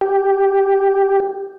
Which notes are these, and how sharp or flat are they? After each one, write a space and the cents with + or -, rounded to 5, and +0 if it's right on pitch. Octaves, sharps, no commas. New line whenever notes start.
G4 +0